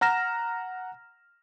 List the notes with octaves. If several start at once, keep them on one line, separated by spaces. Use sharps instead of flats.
F#5 A#5 F6 A#6 E7